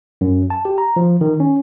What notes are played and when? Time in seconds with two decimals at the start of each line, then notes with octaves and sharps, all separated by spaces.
0.21 F#2
0.50 A5
0.65 G4
0.78 A#5
0.96 F3
1.21 D#3
1.40 C#4